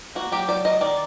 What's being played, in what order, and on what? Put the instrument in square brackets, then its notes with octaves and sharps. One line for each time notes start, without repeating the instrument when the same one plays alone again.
[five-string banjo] A#3 F#4
F#3 G4
F#3 D5
F#3 D#5
D#3 D5